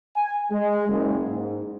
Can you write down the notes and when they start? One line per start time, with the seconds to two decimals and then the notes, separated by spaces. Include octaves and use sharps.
0.16 G#5
0.51 G#3
0.89 F#1
1.27 G#2